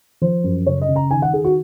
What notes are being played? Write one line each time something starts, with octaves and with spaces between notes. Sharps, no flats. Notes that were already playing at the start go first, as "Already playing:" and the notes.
F3 C5
F#2
C#3 C#5
D#5
C#3
A#5
D#3 G#5
F#5
D#3 G#4
F#4